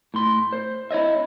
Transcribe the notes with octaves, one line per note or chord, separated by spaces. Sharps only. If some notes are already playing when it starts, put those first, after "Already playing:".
A2 C6
C5
E4 C#5 D#5 E5